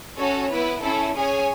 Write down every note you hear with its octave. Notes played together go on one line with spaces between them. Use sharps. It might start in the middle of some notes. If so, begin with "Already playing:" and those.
C#4 F#4 A4 C#5
B3 E4 B4
C#4 E4 A4
C#4 G#4 C#5 G#5